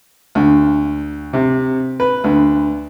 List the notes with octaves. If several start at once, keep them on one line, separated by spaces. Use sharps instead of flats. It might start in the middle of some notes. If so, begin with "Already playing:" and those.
D2
C3
B4
D2